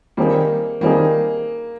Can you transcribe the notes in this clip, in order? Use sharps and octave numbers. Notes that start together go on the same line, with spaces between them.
D#3 G3 A#3 C4 D#4 G#4
D#3 G3 A#3 C4 D#4 G#4